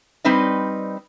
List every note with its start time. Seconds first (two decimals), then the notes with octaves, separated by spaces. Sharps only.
0.24 G3 C4 D#4 B4 C5 D#5